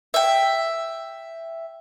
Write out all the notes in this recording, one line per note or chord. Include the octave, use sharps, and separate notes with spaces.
E5 G5